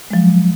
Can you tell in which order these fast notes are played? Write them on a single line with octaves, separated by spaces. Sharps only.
G#3 F3 F#3